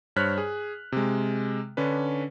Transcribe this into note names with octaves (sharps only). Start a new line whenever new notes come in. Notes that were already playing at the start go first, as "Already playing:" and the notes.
G2 C5 C#5 F6 F#6 B6
G#4
C3 G#3
D3 C#4 D4 B4